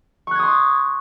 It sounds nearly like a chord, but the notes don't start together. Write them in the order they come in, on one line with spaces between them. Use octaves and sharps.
C#6 F#6 G#6 D#6 C6